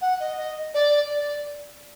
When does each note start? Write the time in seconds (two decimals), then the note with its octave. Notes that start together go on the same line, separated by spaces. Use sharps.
0.01 F#5
0.20 D#5
0.37 D#5
0.74 D5
1.10 D5